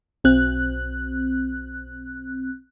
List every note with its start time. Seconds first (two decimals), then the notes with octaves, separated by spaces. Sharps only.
0.24 B1 C4 F#6